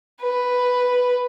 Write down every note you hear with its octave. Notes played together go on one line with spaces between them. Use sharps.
B4